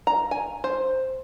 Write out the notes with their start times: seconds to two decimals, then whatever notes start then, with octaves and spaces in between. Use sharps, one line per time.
0.07 A#5
0.31 G#5
0.64 C5